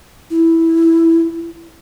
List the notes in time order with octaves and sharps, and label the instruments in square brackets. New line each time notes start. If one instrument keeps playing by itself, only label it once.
[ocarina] E4